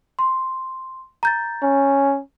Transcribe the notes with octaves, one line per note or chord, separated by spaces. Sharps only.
C6
A#5 G6 A6
C#4